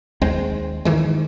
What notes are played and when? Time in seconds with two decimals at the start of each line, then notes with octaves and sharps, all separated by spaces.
0.22 D#2 G#3 C4
0.85 D#3 E3 G#3